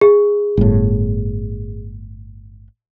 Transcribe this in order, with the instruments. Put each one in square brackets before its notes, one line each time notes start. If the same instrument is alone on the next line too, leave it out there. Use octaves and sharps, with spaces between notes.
[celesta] G#4
[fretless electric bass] G1 A2